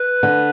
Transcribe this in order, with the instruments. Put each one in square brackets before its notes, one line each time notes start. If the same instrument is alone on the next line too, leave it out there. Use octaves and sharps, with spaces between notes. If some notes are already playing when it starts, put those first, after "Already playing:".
Already playing: [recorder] B4
[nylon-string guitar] D3